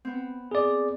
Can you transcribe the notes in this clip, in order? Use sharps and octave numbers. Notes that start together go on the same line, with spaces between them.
B3 C4
G#4 D5